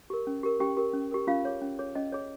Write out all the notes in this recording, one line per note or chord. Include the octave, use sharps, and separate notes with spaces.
G4 A#4
C#4
G4 A#4
C#4 G4 G5
G4 A#4
C#4
G4 A#4
C#4 F4 F5
G#4 C#5
C#4
G#4 C#5
C#4 D#5
G#4 C#5